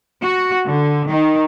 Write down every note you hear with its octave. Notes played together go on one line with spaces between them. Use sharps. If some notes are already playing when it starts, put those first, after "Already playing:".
F#4
D3
D#3